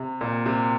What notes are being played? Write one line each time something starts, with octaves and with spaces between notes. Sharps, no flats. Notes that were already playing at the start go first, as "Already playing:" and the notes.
Already playing: C3
A#2
C3